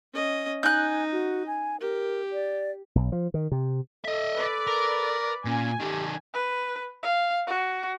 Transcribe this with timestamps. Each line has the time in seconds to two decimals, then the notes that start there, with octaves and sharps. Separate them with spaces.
0.13 C#4 D#5
0.63 D#4 G#5 F#6 G6
1.12 F#4
1.47 G#5
1.81 G4 A#4
2.32 D5
2.95 B1
3.12 F3
3.34 D#3
3.52 C3
4.05 A4 D#5 E5
4.35 B4 D5
4.67 A#4
5.45 A#2 C#4 G#5
5.80 D#3 G4 A4
6.34 B4
7.03 F5
7.47 F#4